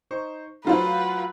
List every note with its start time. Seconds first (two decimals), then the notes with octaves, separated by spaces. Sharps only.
0.11 D#4 C5 C#6
0.65 F#3 A3 F4 B4 C5 F#5 A#5